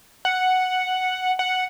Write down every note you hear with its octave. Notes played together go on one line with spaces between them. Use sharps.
F#5
F#5